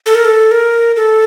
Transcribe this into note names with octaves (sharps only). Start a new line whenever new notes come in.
A4
A#4
A4
A#4
A4